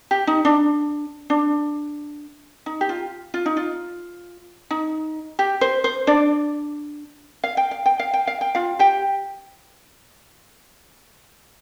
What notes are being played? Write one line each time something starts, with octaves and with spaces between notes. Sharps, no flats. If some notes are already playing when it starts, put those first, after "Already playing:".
G4
D#4
D4
D4
D#4
G4
F4
F4
D#4
F4
D#4
G4
C5
C5
D4 D5
F5
G5
F5
G5
F5
G5
F5
G5
F4 F5
G4 G5